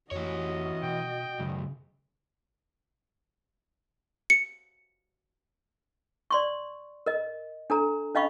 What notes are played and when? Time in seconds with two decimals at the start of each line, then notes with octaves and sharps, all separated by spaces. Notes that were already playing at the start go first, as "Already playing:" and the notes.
0.11 F2 E3 F#4 C#5 D#5
0.83 B2 G5
1.39 B1 F#2 C#3
4.30 C#7
6.31 D5 C6 C#6
7.06 A#4 D#5
7.70 D4 A4 A#5
8.15 C#4 D4 D#5 F5 B5 C#6